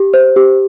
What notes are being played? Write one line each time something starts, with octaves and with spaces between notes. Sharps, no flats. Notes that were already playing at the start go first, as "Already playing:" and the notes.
Already playing: G4
C5
G4